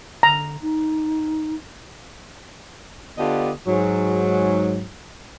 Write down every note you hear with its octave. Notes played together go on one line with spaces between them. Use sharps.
D3 A#5
D#4
D3 B3 D4 F4 G4 D#5
G#2 F#3